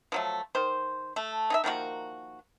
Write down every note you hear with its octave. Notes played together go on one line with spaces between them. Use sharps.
F3 F#3 A3
D#3 C5
A3
D#4 G#4 E5
D#3 F3 A#3 F#4